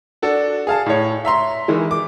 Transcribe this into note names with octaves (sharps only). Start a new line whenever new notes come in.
D4 F#4 A4
G#4 F5 A5
A2 C#5
E5 A#5 C6
D#3 E3 G#3
D6